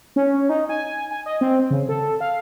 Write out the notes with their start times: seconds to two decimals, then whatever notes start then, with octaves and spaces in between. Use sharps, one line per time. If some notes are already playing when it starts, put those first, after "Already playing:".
0.16 C#4
0.49 D#4
0.69 G#5
1.11 G#5
1.26 D#5
1.41 C4
1.71 C#3
1.89 A4
2.21 F5